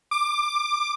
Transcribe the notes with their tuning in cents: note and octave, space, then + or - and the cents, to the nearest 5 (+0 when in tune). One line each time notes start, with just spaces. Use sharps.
D6 +20